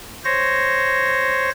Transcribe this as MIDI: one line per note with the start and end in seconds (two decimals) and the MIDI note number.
0.25 1.50 72
0.25 1.50 73
0.25 1.50 94